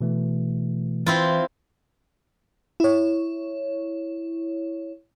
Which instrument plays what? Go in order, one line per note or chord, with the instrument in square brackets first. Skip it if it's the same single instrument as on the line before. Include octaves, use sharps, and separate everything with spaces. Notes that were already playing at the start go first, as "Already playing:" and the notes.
[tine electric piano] B2 E3 A3
[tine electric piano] E3 [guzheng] C4 E4 F4
[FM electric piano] E4 C#5